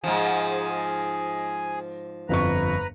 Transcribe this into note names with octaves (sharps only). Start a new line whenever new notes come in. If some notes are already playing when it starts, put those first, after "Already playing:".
G#2 F3 G#4
G1 F2 B4 A#5 C#6